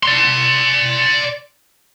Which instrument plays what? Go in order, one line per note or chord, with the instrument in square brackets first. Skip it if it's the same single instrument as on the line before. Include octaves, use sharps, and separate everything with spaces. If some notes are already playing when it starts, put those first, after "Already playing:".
[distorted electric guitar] D5 C6